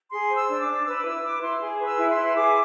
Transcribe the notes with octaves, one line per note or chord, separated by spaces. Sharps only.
G#4 C6
C5
E6
D4
D6
D4
B4 E6
D6
E4 E6
B4 D6
E4 C6
G#4
B4
E6
E4
C6
E4
G#4 D6